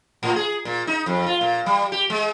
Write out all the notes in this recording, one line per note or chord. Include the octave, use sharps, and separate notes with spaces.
A2
G#4
A#2
D#4
F2
F4
A#2
G3
G4
G#3